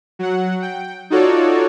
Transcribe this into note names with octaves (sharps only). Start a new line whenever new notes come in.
F#3 F#5
G5
D#4 F4 F#4 A4 C#5 D5